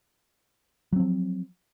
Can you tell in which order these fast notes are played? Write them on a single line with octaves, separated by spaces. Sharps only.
F#3 C4 F3